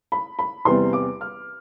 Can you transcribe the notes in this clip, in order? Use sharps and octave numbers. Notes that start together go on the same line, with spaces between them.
B5
B5
E2 C3 G3 B3 C6
D6
F6